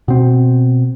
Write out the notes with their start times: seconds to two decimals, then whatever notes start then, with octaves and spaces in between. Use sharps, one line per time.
0.08 B2 C4